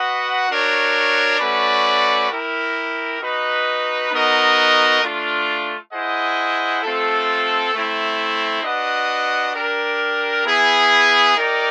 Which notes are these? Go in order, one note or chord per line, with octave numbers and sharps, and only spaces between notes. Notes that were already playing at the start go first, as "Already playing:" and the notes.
Already playing: F#4 B4 D#5 F#5
D4 F#4 A#4 C#5
A3 C#4 F#4 B4 D5
E4 G4 A#4
D#4 F#4 B4 D#5
B3 D#4 F#4 A#4 D#5
A3 D4 F4
E4 G#4 C5 D#5 F#5
A3 C4 F4 A4
A3 C4 E4
D4 F#4 B4 D#5 F#5
D4 G4 A#4
B3 E4 G#4
D#4 G4 A#4 D5